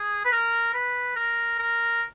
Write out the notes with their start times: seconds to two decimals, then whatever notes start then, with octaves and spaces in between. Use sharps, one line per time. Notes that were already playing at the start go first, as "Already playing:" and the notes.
Already playing: G#4
0.25 B4
0.32 A#4
0.74 B4
1.16 A#4
1.58 A#4